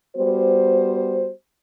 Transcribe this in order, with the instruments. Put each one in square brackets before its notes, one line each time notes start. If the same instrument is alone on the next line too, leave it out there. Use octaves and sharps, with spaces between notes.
[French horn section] G3 B3 F#4 C5